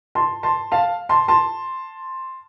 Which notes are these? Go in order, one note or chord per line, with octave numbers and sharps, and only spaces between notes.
A5 C6
A5 C6
F5 A5
A5 C6
A5 C6